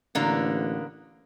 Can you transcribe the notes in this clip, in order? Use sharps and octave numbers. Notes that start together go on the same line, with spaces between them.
A1 D3 A#3 B3